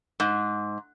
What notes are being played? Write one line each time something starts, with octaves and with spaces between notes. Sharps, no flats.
G#2